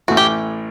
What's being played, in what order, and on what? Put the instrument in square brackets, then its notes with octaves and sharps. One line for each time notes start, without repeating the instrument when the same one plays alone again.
[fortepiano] A1 A2 E3 [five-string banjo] F#4
[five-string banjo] G4